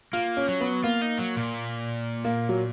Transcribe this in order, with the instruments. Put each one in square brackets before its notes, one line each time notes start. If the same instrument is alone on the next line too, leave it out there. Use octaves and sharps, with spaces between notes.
[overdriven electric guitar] A#3 [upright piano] F4
[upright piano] C#4
[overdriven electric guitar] F#3
[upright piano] B3
[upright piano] A#3 [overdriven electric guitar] F4
[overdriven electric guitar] D#4
F#3
A#2
[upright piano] A#3
F#3